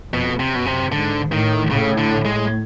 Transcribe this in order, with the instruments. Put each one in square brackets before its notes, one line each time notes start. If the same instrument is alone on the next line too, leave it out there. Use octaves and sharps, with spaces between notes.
[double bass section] F2 [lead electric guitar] B2
[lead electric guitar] C3
[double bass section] F#2 [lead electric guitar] B2
[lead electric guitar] C3
[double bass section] G#2 [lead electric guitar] D3
[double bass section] A2 [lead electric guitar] D#3
[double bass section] A2 [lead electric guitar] C#3
[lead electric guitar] D3
G#3